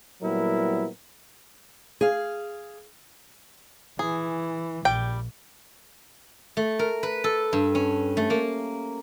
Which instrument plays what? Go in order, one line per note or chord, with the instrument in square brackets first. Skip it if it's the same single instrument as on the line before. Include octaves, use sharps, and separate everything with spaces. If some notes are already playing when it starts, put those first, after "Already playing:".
[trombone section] A#2 F#3 G3 B3 E4 A#4
[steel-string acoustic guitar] G#4 F5
[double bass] E3 [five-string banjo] G#4
[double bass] A#1 [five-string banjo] G3 G5
[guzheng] A3
A#4
B4
A4
G2
C#4
A3
A#3